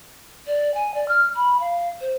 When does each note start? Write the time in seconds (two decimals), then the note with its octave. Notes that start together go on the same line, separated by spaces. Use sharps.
0.47 D5
0.75 G#5
0.94 D5
1.09 F6
1.36 B5
1.60 F5
2.01 C5